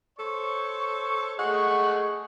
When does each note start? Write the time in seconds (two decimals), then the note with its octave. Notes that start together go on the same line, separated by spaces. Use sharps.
0.19 A4 C5 C#5 C#6
1.39 A3 G#4 D#5 F#5 C#6